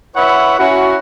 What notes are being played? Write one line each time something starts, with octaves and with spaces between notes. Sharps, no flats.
E4 B4 C#5 E5 F#5
C#4 E4 F#4